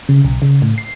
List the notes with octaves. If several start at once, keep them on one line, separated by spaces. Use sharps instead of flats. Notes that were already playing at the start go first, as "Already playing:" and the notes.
C#3
B1
C#3
A2
C7